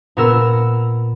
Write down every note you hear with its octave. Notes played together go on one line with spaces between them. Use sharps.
A#2 B3 A#4 E6